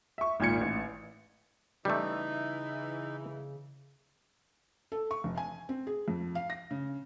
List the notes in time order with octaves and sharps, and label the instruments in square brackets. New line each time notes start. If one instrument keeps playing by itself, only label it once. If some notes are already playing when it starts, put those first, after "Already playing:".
[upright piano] E5 C#6
G#1 A#2 G#6 C#7
A1
[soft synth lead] C#3 [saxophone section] E3 [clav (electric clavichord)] G3 A3 [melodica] D#4
[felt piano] A4
C#6
F1
G#5
C4
G#4
F2
F5
A#6
C#3